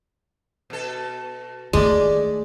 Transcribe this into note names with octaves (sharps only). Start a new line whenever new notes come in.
B2 A4
D#3 G#3 A3 D4 G4 D5